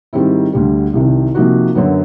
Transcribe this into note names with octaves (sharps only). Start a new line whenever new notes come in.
G#2 D#3 G3 C4 E4
D2 D3 G3
C2 C3 D#3
C3 F3 A#3 D#4 F#4
F#2 D3 F#3 B3